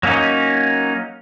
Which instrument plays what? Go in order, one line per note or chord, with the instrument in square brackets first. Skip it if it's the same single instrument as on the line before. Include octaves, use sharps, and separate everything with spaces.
[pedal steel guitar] F#3 A#3 C#4 D#4